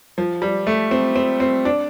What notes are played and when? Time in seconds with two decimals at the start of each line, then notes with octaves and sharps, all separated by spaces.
0.18 F3
0.42 G3
0.67 A3
0.91 C4
1.15 C4
1.40 C4
1.65 D4